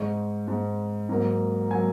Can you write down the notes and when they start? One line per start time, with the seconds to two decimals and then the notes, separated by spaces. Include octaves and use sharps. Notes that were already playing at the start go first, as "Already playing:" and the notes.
Already playing: G#2 G#3 C#6
0.48 G#2 G#3
1.09 G#2 F#3 A#3 A#5
1.71 F#3 A#3 G#5